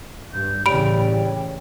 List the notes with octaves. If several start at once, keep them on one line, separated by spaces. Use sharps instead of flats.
G2 G6
A2 C#3 E3 G3 C#5 G5 B5 D7